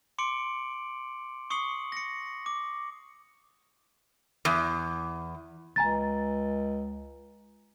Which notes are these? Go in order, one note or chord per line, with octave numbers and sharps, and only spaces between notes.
C6 D6 C#7 D7 F#7
C#6 D#6 C7 C#7 F#7
A#6 C#7
D6
E2
C#2 G#5 A#5 A6